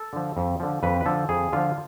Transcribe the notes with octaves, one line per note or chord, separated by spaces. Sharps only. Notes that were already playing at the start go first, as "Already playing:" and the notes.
Already playing: A4
D3 F3
F2
D3 F3
F2 B4
B4
D3 F3 A4
F2 G#4
D3 F3 F4